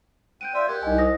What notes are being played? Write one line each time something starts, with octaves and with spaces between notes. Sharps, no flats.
C4 F#5 G6 D7 D#7
F4 C5 D5 E5
G4 A#4 F#5 G#6
C2 D#4 D#5 G#5
C5 D#6 A#6